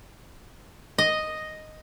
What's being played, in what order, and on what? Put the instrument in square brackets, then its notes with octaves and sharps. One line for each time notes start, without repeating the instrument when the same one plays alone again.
[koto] D#5